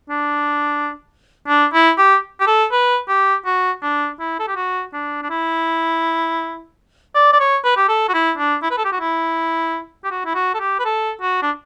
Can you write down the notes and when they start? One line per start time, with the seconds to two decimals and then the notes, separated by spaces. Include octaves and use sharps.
0.10 D4
1.48 D4
1.73 E4
1.98 G4
2.41 G4
2.47 A4
2.72 B4
3.09 G4
3.46 F#4
3.83 D4
4.20 E4
4.40 A4
4.48 G4
4.56 F#4
4.93 D4
5.23 D4
5.30 E4
7.15 D5
7.33 D5
7.40 C#5
7.65 B4
7.77 G4
7.89 A4
8.09 F#4
8.14 E4
8.38 D4
8.63 E4
8.71 B4
8.78 A4
8.85 G4
8.93 F#4
9.00 E4
10.04 G4
10.11 F#4
10.26 E4
10.35 F#4
10.55 A4
10.60 G4
10.80 B4
10.85 A4
11.22 F#4
11.42 D4